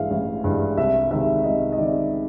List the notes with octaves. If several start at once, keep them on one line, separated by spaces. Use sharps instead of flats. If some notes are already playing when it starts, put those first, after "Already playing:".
Already playing: A1 G2 E3 G#3 E5 F5
A1
G2 E3 G#3
C2 E5
C3 D#3 G#3 E5
C2 D#5
D#5
C3 D#3 G#3 D5